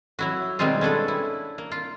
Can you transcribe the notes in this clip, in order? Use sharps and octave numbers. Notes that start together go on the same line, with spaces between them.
F#3 E4 F#4
B2 D#3 G3 G#3 C4 F4
C#4 D4 A4 B4
E4
A#3
F4